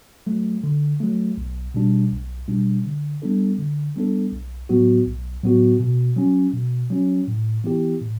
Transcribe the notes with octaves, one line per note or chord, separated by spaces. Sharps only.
F#3 A3
D3
F#3 A3
B1
B2 G3 D4
B1
B2 G3 D4
D3
G3 B3 D4 A4
D3
G3 B3 D4 A4
B1
A2 F#3 B3 F#4
B1
A2 F#3 B3 F#4
B2
F#3 C#4
B2
F#3 C#4
A2
E3 B3 E4 G4
A2